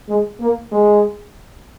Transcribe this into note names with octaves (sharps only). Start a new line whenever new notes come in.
G#3
A#3
G#3